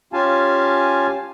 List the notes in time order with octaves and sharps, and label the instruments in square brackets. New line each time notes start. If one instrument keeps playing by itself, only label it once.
[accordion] C#4 F4 G4 F5 G#5 A5